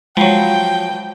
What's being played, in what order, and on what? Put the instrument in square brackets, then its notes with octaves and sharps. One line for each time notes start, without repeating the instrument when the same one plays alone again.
[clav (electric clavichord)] F3 F#3 [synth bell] G#3 B5 C7 [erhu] G5